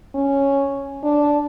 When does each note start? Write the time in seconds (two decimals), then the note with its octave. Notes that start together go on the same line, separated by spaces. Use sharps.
0.14 C#4
1.03 D4